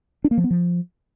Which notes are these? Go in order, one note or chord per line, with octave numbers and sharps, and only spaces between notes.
D4
A#3
F3
B3
F3